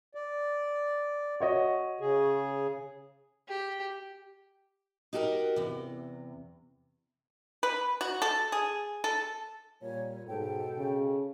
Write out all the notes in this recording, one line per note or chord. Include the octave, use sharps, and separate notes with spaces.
D5
F#4 C#5 D#5
C#3 G#4
G4
D#4 F#4 G4 A4 A#4
E2 C3
B4
F#4
A4
G#4
A4
A#2 G3 C#5
G#2 B2 A4 G5
C#3